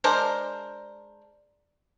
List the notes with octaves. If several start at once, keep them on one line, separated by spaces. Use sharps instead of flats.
G#3 D4 A#4 C5